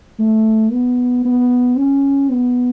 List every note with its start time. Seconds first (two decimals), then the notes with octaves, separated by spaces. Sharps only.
0.19 A3
0.72 B3
1.25 B3
1.77 C#4
2.31 B3